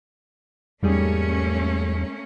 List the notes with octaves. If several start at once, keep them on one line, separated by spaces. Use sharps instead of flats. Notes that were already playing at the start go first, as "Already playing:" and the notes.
E2 G#2 G3 A3 A#3 C#4 G#4